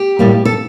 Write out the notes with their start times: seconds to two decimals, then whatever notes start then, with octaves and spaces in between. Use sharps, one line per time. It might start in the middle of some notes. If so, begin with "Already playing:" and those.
Already playing: G4
0.19 A2 G3 A#3
0.45 A4